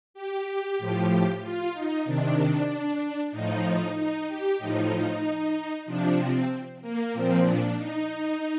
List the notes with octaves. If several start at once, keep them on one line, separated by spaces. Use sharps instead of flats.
G4
A2 F3
F4
D#4
C3 D#3 D4
A2 F3 D#4
D#4
G4
A2 F3 D#4
C3 F3 D4
C4
A#3
A#2 F3 C4
D4
D#4